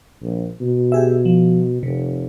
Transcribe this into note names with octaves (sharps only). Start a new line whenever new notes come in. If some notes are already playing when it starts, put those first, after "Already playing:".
A#1
B2
G4 G#4 E5
F3
F1 C3